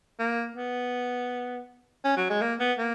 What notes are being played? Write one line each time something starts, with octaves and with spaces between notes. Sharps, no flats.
A#3
B3
C#4
F#3
G#3
A#3
B3
A#3